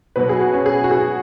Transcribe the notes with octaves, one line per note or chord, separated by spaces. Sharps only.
B2 F#3 B4
G#4
F#4
C#4
G#4
F#4
G#4